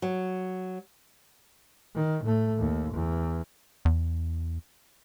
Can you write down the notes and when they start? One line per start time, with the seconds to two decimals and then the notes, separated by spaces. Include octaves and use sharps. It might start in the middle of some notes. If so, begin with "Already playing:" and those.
0.02 F#3
1.95 D#3
2.23 A2 A3
2.58 D#2
2.93 E2
3.85 E2